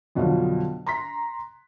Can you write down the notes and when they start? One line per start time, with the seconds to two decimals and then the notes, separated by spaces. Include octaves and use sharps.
0.15 F2 B2 D3 F#3 F4
0.86 A#5 C6 B6